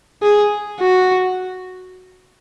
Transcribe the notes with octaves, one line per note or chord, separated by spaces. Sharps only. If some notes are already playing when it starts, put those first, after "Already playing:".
G#4
F#4